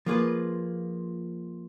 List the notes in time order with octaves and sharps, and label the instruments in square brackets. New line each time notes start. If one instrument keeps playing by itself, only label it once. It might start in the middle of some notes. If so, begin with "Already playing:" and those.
[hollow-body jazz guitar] F3 A#3 F4 G#4 B4